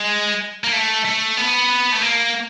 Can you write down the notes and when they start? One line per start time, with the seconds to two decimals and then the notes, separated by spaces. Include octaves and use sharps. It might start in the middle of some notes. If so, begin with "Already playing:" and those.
Already playing: G#3
0.64 A#3
0.72 A3
1.05 A3
1.37 B3
1.92 A3
2.03 A#3